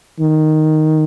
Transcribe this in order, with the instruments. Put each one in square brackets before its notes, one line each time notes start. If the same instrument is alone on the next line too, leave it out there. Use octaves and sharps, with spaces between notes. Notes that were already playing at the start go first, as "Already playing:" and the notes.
[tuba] D#3